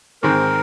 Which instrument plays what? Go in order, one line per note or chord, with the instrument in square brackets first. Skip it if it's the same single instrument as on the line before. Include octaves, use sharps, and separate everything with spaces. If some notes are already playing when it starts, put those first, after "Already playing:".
[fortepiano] G#2 D#3 G#3 C4 [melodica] A#4